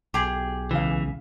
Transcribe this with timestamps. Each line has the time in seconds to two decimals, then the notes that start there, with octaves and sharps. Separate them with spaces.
0.14 B1 G4 G#4
0.71 C#2 C#3 E3 F5